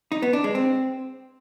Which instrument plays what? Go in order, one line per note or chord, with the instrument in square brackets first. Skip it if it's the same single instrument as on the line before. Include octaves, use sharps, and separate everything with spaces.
[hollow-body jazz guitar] D#4
B3
D4
G#3
C4